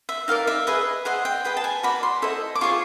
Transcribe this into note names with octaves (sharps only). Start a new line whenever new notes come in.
E5
D#4 G4 A#4 D5 F5
E5
G#4 B4 D#5 E5
G#4 C5 D#5 F#5
G5
G#4 B4 D#5 G5
A5
G#5
F#4 A#4 D5 B5
C6
E4 A4 C5 D#5
D6
F4 G#4 C5 C#6